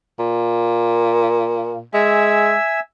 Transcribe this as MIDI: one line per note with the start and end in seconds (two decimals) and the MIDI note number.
0.19 1.83 46
1.94 2.54 56
1.94 2.80 76
1.94 2.80 80
1.94 2.80 88